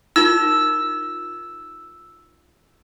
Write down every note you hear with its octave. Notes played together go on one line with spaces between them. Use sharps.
D#4 F4 A#4 E6